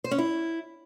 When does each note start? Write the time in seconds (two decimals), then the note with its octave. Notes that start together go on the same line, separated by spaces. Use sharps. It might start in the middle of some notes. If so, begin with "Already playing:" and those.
0.04 C5
0.11 C#4
0.18 E4